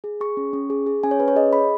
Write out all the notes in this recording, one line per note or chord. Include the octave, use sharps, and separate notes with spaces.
G#4
G#4 C#6
C#4
C#4
G#4
G#4
C#4 G#5
C#5
C#4 B4
C#5
G#4 D#5
G#4 B5